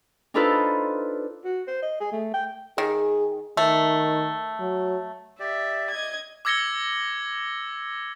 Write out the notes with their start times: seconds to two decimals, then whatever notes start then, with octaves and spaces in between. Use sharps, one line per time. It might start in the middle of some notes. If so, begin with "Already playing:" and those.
0.34 D4 D#4 F4 A4 B4 C5
1.45 F#4
1.68 C5
1.82 D#5
2.00 G#4
2.12 A3
2.34 G5
2.78 D#3 G#4
3.57 D#3 A3
4.60 F#3
5.40 G4 D5 E5
5.91 D#5 G#6
6.45 D6 E6 G#6 A#6 C#7 G7